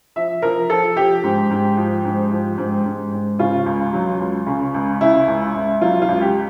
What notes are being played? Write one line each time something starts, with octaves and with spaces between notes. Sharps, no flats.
F3 E5
F3 A#4
F3 A4
F3 G4
G#2
G#2
F3
G#2
F3
G#2
G#2
G#2
C#3 F4
C#2
F#3
C#2
C#3
C#2
C#3 E4
C#2
C#2
F#3 F4
F4
C#2
G4